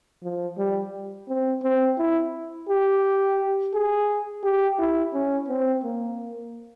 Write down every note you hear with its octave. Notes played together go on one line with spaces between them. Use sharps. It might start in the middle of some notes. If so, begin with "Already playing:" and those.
F3
G3
C4
C4
E4
G4
G#4
G4
E4
C#4
C4
A#3